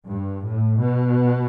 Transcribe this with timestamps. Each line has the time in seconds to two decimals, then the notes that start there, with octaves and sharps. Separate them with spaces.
0.09 G2
0.45 A2
0.81 B2